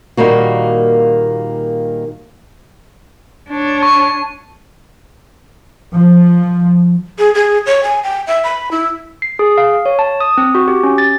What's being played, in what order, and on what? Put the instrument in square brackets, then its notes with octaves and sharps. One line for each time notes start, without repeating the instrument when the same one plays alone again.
[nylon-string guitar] A#2 D#3 G3 A#3 F#4
[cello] D4 C#5
[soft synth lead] A5 [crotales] C#6
[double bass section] F3
[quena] G#4
G#4
C#5
G#5
G5
E5
B5
E4
[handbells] C7
G#4
F5
C#5
A5
D#6
C4
F#4
G4
C#4
A6